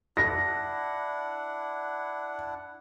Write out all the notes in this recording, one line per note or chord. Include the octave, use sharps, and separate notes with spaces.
D4 E4 F#5 A#6